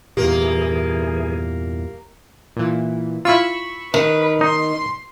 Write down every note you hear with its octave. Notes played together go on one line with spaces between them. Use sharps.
E2 G2 A#2 E3 A#3 G4 G#4
A#2 E3
E4 F4 B5 C#6 E6
D#3 B4
D#4 C6